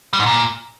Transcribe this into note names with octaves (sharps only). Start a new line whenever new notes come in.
G3
G#2
A#2